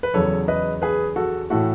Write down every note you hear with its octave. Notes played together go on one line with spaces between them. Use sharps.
B4
E2 C#3 F#3 A4 C#5
B4 D#5
G#4 B4
F#4 A4
A2 E3 A3 F#4 A4